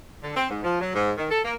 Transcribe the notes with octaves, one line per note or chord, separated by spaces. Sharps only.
D3
C4
G#2
F3
F#3
G#2
D#3
A4
A#3